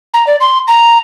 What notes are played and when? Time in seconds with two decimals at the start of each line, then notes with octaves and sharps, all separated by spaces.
0.14 A#5
0.27 D5
0.41 C6
0.68 A#5